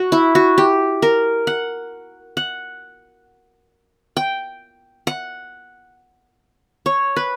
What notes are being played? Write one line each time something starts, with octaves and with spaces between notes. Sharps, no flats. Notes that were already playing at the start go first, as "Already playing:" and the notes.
Already playing: F#4
E4
F#4
G4
A#4
F#5
F#5
G5
F#5
C#5
B4